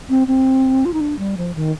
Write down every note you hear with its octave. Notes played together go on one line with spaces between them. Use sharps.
C4
C4
F4
D#4
D4
G3
F3
D#3